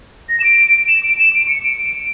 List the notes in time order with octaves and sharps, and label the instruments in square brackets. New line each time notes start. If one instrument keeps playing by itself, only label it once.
[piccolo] A#6
E7
D7
E7
D7
E7
D7
C#7
D7
D7